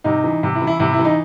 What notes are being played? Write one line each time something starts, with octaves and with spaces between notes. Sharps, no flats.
C3 D#4
E3
C3
E4
E3
E4
C3 E4
E4
E3
D#4